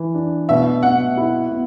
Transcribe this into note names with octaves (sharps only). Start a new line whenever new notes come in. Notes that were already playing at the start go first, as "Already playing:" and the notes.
Already playing: E3
D4
B2 E5
B2 F#5
E4
B3